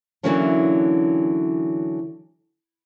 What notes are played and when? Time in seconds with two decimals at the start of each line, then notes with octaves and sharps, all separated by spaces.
0.23 D3 E3 F#3 A#3 C#4 D4